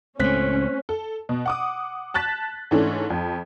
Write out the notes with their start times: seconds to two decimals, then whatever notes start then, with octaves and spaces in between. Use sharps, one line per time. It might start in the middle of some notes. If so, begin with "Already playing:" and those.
0.20 C#2 A2 A3 C4 C#4 C5 F#6 B6
0.89 A4
1.29 B2
1.46 F#5 D6 D#6
2.14 A5 F#6 A6 B6
2.71 G#2 E3 A3 C#4 D4
3.10 F2